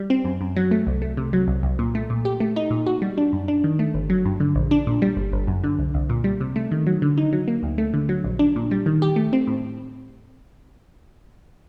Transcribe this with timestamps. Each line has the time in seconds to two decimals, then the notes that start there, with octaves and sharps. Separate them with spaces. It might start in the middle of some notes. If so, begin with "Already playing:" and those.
Already playing: G3
0.10 C4
0.25 F#2
0.41 F#2
0.56 F#3
0.71 A3
0.87 C2
1.02 A3
1.17 C3
1.33 F#3
1.48 C2
1.63 C2
1.79 A#2
1.95 A3
2.10 A#2
2.25 G4
2.40 A3
2.56 D#4
2.71 A#2
2.86 F#4
3.02 G3
3.18 D4
3.33 F#2
3.48 D4
3.64 D#3
3.79 A3
3.94 G1
4.10 F#3
4.25 G2
4.40 D3
4.55 A#1
4.71 D4
4.87 A#2
5.02 G3
5.17 G1
5.32 G1
5.47 F#2
5.64 D3
5.79 C2
5.94 C2
6.09 A#2
6.24 G3
6.41 C3
6.56 A3
6.71 D#3
6.87 F#3
7.02 D3
7.18 D#4
7.33 F#3
7.48 A#3
7.63 D2
7.78 A3
7.94 D3
8.09 F#3
8.24 A#1
8.39 D4
8.56 A#2
8.71 G3
8.86 D#3
9.02 G4
9.16 A3
9.33 C4
9.47 A2